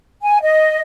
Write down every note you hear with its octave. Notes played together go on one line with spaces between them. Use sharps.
G#5
D#5